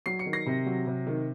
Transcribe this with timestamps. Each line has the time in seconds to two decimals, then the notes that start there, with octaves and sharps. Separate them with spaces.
0.06 F#3 C7
0.19 C#7
0.26 D#3
0.33 A#6 C7
0.46 C3
0.66 F#3
0.87 C3
1.07 D#3